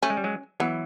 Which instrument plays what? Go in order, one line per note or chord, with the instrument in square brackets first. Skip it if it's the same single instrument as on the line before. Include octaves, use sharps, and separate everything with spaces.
[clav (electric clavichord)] A3 [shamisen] C#4
[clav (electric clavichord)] G#3
G3
F#3 G#3
[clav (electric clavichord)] E3 F#3 [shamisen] B3